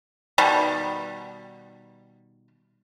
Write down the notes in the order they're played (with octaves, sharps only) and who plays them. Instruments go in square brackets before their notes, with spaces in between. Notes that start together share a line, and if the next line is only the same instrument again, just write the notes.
[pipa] B2 D#3 G3